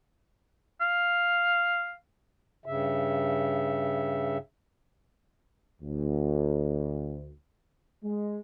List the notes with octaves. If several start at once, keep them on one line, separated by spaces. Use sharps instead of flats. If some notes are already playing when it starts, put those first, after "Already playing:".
F5
G2 C#3 E5
D2
G#3